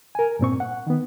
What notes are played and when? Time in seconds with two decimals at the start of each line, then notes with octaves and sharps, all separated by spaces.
0.15 A#4 G#5
0.39 G2 A#2 C4 C#6
0.60 F#5
0.87 D#3 B3